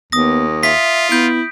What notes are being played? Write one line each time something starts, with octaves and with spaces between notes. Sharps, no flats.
D#2 B3 D#6 A#6
F4 E5 B6
B3 E4 G6 D7